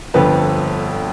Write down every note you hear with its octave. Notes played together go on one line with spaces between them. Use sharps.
G1 F2 D3 F3 B4